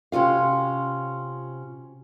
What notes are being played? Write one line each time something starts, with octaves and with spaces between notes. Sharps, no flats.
C3 C#4 F4 F5